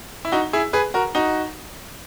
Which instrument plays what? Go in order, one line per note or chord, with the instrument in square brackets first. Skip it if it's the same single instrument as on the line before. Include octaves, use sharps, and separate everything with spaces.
[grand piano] E4
D#4 F#4
E4 G#4
G#4 B4
F#4 A#4
D#4 F#4